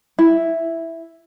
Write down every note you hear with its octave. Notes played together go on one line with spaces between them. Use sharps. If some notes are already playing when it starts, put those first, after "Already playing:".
E4